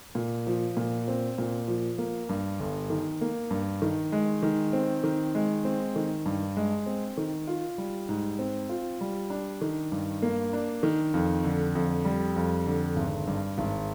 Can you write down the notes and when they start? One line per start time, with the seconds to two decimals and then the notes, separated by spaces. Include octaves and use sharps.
0.15 A#2
0.47 F3
0.77 A#2
1.08 C4
1.38 A#2
1.68 F3
1.98 A#3
2.29 G2
2.60 G1
2.90 D#3
3.21 A#3
3.51 G2
3.82 D#3
4.12 G#3
4.43 D#3
4.73 C4
5.04 D#3
5.35 G#3
5.65 C4
5.96 D#3
6.26 G2
6.57 G#3
6.86 C4
7.17 D#3
7.47 F4
7.78 G3
8.09 G#2
8.39 C4
8.69 F4
9.01 G3
9.30 D4
9.61 D#3
9.92 G2
10.22 A#3
10.53 D4
10.83 D#3
11.14 F2
11.44 D3
11.75 F2
12.05 G3
12.36 F2
12.66 D3
12.96 G#1
13.27 G2
13.58 G#1